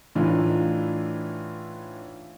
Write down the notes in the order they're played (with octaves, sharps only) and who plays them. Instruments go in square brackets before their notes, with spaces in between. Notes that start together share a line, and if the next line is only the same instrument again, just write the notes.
[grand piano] A2 E3 D4 D#4 F4